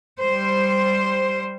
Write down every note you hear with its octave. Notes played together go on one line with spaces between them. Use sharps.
G3 C5